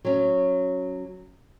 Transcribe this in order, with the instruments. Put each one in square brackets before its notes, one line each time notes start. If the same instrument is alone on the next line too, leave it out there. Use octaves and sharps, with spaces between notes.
[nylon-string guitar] F#3 C#4